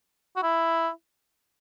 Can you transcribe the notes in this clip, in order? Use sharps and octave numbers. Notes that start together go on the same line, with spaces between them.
F#4
E4